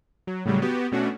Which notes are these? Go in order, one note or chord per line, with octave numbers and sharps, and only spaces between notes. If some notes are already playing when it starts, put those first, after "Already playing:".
F#3
A2 C#3 F#3 G3
B3 F#4 G4
B2 A3 C#4 D4 F#4